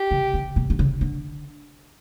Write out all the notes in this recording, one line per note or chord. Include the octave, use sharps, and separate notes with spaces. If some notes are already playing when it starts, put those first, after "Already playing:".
Already playing: G4
C#3
C#3
B2
D3
C#3
D3